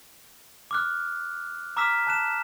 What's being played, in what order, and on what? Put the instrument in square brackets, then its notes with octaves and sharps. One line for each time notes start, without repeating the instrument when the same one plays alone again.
[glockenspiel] D6 F6 F#6
A#5 D6 E6 F6 B6 E7
A5 F#6 E7